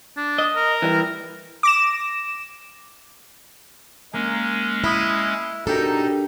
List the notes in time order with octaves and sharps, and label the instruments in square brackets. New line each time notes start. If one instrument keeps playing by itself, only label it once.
[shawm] D4
[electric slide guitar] D#5
[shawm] A#4
[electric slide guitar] E3 G3
[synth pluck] D6 A#6 E7
[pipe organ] G#3 C#4 [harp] A#3
[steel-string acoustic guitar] E4 [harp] B5 D#6 F#6
[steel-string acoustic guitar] B2 A4 [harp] D4 G4 A#4 [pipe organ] D#4